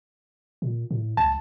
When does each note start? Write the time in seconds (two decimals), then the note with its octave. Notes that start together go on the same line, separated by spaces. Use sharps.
0.62 A#2
0.91 A2
1.17 C#2 A5